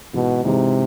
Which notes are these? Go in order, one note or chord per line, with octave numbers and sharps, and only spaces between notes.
G#2 B2 E3 G#3
G#2 C3 E3 G#3